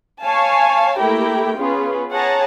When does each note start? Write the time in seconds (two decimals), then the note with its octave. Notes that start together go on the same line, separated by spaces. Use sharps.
0.23 C#5 F5 G#5 A5
0.97 A3 A#3 E4 G4 A#4 G5
1.56 B3 C#4 F4 G#4 B4
2.11 G#4 C#5 F#5 A5 A#5